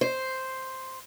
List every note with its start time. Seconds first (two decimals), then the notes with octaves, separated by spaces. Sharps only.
0.01 C5